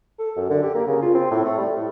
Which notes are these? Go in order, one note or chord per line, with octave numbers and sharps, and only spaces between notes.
A4
F#2
D3
G4
A#3
C#3
F4
C4
A2
A3
G3
A2